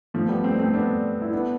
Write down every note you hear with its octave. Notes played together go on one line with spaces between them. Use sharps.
F3 A3
G3 B3
A3 C4
A3 C4
B3 D4
E4
B3 D4